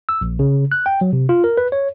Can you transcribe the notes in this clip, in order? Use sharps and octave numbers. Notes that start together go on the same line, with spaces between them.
E6
A#1
C#3
F#6
G5
F#3
C3
F4
A#4
B4
C#5